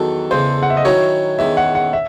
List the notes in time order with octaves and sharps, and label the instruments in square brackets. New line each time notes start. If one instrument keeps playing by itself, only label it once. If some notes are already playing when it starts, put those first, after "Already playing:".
Already playing: [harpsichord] E2 D#3 F#3 [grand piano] A4
[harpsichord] E2 C#3 G#3 [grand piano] C5
[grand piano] F#5
E5
D#5
[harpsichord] D#3 F#3 C#4 E4 [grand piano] C#5
[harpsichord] E2 D#3 G#3 [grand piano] E5
[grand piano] F#5
F#5
E5